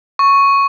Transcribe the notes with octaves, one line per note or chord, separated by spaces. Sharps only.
C#6